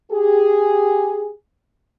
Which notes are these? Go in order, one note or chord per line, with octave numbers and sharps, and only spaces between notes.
G4 G#4